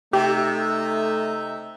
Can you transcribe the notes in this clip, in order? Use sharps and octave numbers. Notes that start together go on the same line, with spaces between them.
C3 A3 D#4 G4 E5